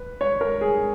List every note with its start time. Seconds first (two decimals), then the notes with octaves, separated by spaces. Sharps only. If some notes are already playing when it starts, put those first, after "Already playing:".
Already playing: B4
0.21 C#5
0.41 A#4
0.61 G#4